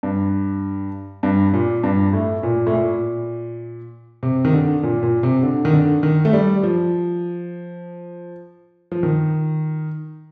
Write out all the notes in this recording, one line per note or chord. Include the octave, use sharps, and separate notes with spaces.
G2
G2
A#2
G2
A2
A#2
A2
A#2
C3
D#3
D3
A#2
A#2
C3
D3
D#3
D3
D#3
A3
G3
F3
F3
D#3